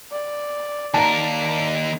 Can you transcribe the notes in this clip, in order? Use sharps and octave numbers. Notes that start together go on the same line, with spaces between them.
D5
D#2 A#4 D5 A5 A#5